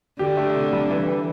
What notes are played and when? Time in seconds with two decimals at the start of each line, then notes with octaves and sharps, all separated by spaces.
0.19 D3 G4
0.37 A3
0.55 C3
0.73 G3
0.90 E3
1.08 E3